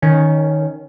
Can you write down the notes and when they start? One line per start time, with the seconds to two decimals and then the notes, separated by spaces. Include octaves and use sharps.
0.02 D#3 C#4